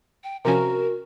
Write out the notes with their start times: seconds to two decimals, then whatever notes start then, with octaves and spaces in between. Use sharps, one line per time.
0.24 G5
0.45 C3 F3 C#4 F#4 A#4